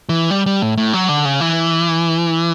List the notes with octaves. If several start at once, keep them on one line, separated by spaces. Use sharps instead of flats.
E3
G3
G3
A2
A2
F#3
D3
C#3
E3